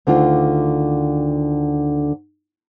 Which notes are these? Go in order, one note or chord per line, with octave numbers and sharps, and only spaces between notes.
D2 D3 D#3 F4